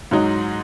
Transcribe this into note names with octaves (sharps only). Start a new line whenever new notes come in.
G#2 F#3 D#4